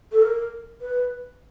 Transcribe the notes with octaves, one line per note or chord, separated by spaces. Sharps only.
A4
A#4
B4